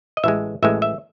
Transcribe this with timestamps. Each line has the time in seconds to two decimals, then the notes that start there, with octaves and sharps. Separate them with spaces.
0.17 D#5
0.24 A1 A2 G#3 E5
0.63 A1 A2 G#3 E5
0.82 E5